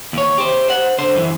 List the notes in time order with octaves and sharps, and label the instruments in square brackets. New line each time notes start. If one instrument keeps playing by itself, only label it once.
[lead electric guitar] D#2 C#5
G4 C5
C5 F#5
D3 C5
F#2 E3